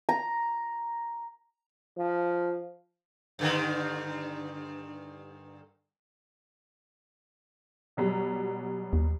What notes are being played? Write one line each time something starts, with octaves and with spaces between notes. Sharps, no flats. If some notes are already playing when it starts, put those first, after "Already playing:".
A#5
F3
G2 D3 D#3
B2 F#3 G3
D#2